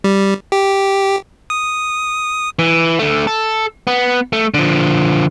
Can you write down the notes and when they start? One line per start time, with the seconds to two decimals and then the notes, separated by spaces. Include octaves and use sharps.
0.04 G3
0.52 G4
1.50 D#6
2.59 E3
2.99 D3 A3
3.27 A4
3.87 B3
4.33 A3
4.54 D3 F3